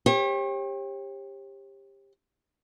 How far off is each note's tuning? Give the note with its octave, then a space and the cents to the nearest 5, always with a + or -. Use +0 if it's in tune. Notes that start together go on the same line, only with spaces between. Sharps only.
G4 +20 C#5 -45